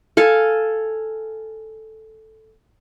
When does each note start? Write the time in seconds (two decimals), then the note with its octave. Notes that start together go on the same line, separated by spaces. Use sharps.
0.17 A4 F5 G#5